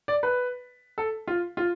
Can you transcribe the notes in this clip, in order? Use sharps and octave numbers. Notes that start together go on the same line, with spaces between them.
D5
B4
A4
F4
F4